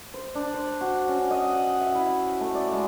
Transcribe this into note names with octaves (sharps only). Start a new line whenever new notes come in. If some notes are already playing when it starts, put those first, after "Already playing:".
C5
D4
C5
F#4
C#4
D#5
F#5
E5
E4
A3
D5
G#3